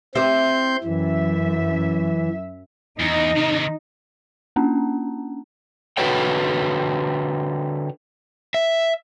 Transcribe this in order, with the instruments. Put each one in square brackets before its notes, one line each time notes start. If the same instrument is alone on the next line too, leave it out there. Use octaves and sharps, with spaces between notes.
[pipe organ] C4 C6 G6 [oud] E4 G4 C5
[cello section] F#2 E5 [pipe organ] E3
[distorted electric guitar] E2 [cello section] D#4
[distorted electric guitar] C3 D#3
[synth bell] A#3 C#4 D4
[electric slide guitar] D3 F#4 B4 C#5 G5
E5